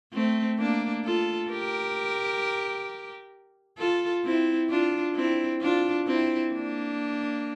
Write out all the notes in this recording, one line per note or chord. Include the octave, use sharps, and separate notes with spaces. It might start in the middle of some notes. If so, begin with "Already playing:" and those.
A3 C4
A#3 D4
F4 A4
G4 A#4
F4 A4
C4 E4
D4 F4
C4 E4
D4 F4
C4 E4
A#3 D4